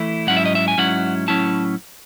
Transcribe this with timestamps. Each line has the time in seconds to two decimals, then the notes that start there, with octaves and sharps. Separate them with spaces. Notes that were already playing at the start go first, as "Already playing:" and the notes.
Already playing: E3 A3 E4
0.27 G#2 F#3 C#4 E4 F#5
0.37 E5
0.46 D#5
0.55 E5
0.68 G#5
0.78 G#2 F#3 C#4 E4 F#5
1.28 A2 F#3 C#4 E4 A5